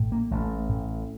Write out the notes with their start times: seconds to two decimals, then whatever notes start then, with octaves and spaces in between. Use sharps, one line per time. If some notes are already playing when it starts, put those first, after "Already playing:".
Already playing: A1 A2
0.12 A#3
0.31 A1 A3
0.69 A2